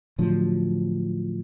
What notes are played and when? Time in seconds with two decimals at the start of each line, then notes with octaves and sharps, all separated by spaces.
0.18 A2 D3 F3 F#3